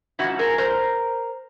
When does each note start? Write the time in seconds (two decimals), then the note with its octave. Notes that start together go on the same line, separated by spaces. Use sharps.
0.19 G#2 F3 E4 F#4
0.39 G#4 A#4
0.58 A#4 C5